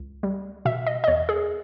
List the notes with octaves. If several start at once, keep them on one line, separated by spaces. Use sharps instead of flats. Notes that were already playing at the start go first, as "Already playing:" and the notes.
Already playing: C#2
G3
B2 E5
D#5
D#5
E2 C#5
G#4